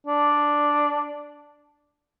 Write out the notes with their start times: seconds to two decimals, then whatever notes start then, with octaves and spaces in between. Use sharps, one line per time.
0.07 D4